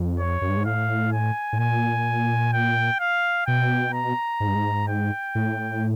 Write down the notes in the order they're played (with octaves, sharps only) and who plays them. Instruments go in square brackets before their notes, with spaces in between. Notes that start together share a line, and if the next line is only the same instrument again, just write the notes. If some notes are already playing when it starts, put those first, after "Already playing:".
Already playing: [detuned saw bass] F2
[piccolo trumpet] C#5
[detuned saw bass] F#2
G2
G#2
[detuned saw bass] A2 [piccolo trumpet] F5
[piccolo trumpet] G#5
[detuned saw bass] A2
[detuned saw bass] A#2 [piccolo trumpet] G#5
[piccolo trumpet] G5
F5
[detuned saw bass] B2 [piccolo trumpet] G5
[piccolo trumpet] A#5
[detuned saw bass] G#2
G2
G#2
[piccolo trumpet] G5
[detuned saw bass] A2